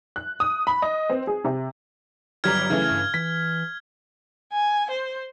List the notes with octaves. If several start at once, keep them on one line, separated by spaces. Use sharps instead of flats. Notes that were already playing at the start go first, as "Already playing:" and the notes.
F#6
D#6
B5
D#5
C4
G#4
C3
G1 F#3 G3 A#5 F6 G#6
C#3 E3 A3
G2
E3 B6
G#5
C5